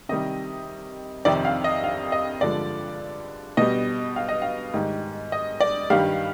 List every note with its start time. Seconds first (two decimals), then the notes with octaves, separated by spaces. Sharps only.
0.09 C3 D#3 G3 D#5
1.25 F2 C3 D#3 D5
1.45 F5
1.64 D#5
1.84 F5
2.12 D#5
2.41 G2 D3 F3 G#3 D5
3.57 B2 G3 D#5
4.16 F5
4.29 D#5
4.42 F5
4.74 G#2 D#3 G3
5.32 D#5
5.60 D5
5.90 G2 D#3 G3 F5